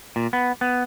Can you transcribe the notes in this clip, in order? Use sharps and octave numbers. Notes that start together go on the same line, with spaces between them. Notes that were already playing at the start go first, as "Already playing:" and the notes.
A#2
B3
B3